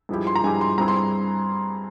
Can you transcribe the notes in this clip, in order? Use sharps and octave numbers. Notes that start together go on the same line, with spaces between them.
G2 F3 G#3 E4 G4
C6
A#5
G2 F3 G#3 E4 G4 G#5
C6
G2 G3 C4 E4 G#4 A#5
C6